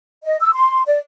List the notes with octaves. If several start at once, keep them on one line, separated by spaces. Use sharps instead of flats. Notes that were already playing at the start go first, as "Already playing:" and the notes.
D#5
E6
C6
D5